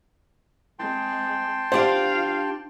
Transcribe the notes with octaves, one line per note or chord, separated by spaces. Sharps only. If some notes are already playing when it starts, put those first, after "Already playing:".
G#3 C4 G5 A5 C6
D4 F4 G4 C5 F5 F#5